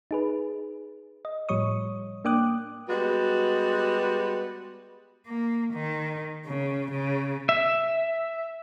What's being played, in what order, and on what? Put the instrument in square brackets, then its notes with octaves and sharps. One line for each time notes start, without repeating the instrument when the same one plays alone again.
[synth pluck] D#4 G#4 B4
D#5
A2 F3 G3 C#5 C#6 D#6
A#3 D4 G5 D6 D#6 F#6
[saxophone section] G3 G#3 B3 F#4 B4
[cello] A#3
D#3
C#3
C#3
[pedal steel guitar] E5